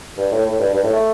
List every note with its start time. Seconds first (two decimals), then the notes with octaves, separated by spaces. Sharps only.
0.18 G2
0.32 A2
0.45 A2
0.59 G2
0.73 G2
0.84 A2
0.93 A3